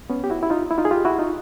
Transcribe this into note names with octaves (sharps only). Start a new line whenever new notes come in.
B3 C#4
G4
E4 F#4
E4
D#4 F4
E4
D#4 F4
G#4
F4 G4
E4 F#4
D#4 F4